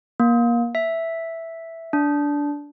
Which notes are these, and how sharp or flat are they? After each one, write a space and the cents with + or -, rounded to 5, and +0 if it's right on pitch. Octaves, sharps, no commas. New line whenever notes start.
A#3 +25
E5 +0
D4 -15